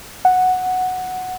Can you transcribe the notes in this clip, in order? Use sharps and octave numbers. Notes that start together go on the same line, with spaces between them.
F#5